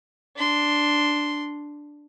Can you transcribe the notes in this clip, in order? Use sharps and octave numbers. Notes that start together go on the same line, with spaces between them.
D4 C6